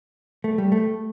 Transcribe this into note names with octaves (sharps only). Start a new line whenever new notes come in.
A3
G3
A3